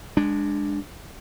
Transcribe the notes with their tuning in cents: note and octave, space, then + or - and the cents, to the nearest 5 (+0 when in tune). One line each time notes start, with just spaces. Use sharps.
G#3 -15 D4 +0